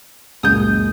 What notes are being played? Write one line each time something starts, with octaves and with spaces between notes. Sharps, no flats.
C#2 F#2 A#2 D#6 G6